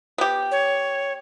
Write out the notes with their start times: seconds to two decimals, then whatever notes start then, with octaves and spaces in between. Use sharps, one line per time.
0.18 B3 G4
0.51 C#5